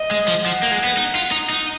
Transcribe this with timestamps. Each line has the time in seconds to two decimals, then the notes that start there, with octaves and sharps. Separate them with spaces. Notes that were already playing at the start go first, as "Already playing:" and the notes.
Already playing: D#5
0.11 G#3
0.28 F3
0.45 F3 F#5
0.63 A#3
0.71 G#3
0.84 B3
0.97 D#4
1.15 F4
1.31 D#4
1.50 D#4